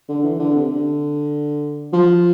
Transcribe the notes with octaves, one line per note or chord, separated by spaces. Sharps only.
D3
E3
D3
C3
D3
F3